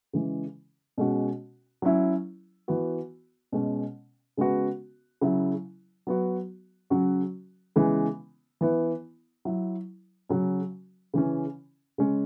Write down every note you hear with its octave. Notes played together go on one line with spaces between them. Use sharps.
C#3 E3 G#3
B2 G#3 C#4 F#4
F#3 C#4 E4
E3 B3 F#4
B2 G#3 C#4
C#3 G#3 B3 F#4
C#3 F#3 E4
F#3 B3 F#4
C#3 F#3 C#4 F#4
C#3 E3 G#3 B3
E3 B3 E4
F#3 E4
C#3 F#3 C#4 F#4
C#3 E3 C#4
C#3 G#3 C#4